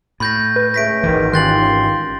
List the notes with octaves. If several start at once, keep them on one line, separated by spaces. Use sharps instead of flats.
A2 B5 G6 A#6
B4
C#2 A3 A#6 B6 D7
G#1 G#2 D#3 E3
D#3 C#4 F4 G4 C6 F#6 A6 F#7